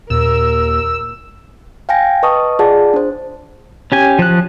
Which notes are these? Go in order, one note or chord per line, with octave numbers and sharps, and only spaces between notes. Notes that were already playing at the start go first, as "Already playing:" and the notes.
D#2 A#2 A#4 E6
F5 G5 G#5 A#6
B4 D#5 A5 C#6 D#6
F4 G#4 D5 F#5 A5
D4 C5
C#4 G4 G#5
F3 F#6